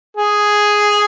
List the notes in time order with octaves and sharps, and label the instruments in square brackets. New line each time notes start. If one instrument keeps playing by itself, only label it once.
[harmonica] G#4